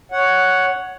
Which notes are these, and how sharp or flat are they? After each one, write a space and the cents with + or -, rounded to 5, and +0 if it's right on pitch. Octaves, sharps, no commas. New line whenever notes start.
C#5 +5 F#5 +0